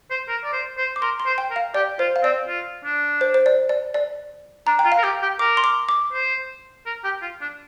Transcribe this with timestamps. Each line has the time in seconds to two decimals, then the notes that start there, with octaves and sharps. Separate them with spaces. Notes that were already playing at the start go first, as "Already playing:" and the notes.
0.11 C5
0.29 A#4
0.44 D5
0.53 C5
0.78 C5
0.96 D6
1.02 A#4 C6
1.20 C6
1.26 C5
1.38 G5
1.51 A#4
1.56 F5
1.74 G4 D5
1.99 F4 C5
2.16 F5
2.23 C4 D5
2.48 F4
2.85 D4
3.21 C5
3.34 C5
3.46 D5
3.69 D5
3.94 D5
4.67 D4 A#5
4.79 G5
4.85 F4
4.92 F5
4.98 A#4
5.03 G4 G5
5.22 G4
5.39 A#4 D6
5.57 C6
5.64 D6
5.89 D6
6.13 C5
6.86 A#4
7.04 G4
7.22 F4
7.41 D4